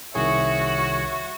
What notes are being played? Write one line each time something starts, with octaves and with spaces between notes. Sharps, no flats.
C2 D#3 F#4 G#4 C#5 E5